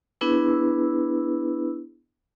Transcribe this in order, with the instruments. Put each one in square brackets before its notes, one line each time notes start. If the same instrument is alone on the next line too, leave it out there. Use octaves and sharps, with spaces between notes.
[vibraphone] B3 D4 E4 G#4 B4 E6